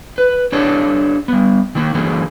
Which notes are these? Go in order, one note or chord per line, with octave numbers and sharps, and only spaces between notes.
B4
D4 G4 A4 C#5 D5
G3 B3
D#3 A#3
D3 E3 F#3 G#3 A#3